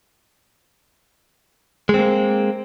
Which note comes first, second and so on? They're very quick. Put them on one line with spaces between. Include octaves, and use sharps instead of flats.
G#3 C4 A#3